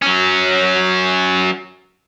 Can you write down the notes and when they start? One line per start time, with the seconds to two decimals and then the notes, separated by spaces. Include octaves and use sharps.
0.02 F#3 C#4